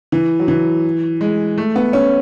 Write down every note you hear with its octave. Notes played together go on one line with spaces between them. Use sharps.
E3
F#3
E3
G#3
A3
B3
C#4